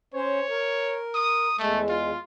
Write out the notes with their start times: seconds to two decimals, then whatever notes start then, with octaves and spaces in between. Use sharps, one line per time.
0.14 C#4 C5 C#5
0.49 A#4
1.14 D#6
1.59 E2 G#3 A3
1.89 F4